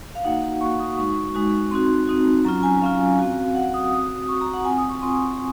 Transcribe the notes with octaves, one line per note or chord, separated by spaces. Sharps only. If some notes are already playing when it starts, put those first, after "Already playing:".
F5
A#3 D#4 F#4 F#5
A#3 D#4 F#4 C#6
D#6
G#3 D#4 F#4 C#6
G#3 D#4 F#4
C4 D#4 F#4 C6
C4 D#4 F#4
F#3 C#4 F4 A#5
G#5
F#3 C#4 F4 F5
C4 F#4
C4 F#4 F#5
D#6
C4 F#4 D#6
C4 F#4 C#6
A#5
F#5
C4 F4 G#5
D#6
C#6
C4 F4 C6